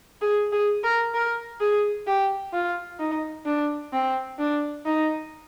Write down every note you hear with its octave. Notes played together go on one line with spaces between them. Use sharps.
G#4
G#4
A#4
A#4
G#4
G4
F4
D#4
D4
C4
D4
D#4